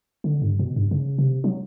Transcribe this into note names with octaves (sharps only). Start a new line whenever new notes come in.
D3
G2
B2
G2
C#3
C3
F#3